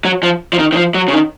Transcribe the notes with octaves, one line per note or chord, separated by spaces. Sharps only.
F#3
F3
F3
D#3
D#3
F3
F#3
C#3
D#3